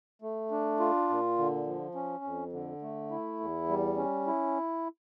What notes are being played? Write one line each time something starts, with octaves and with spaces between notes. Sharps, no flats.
A3
D4
F4
A#2
D3
F3
C#4
F2
D3
A3
E4
E2
G3
C#4
E4